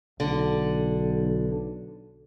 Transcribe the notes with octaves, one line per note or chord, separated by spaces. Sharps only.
B1 D3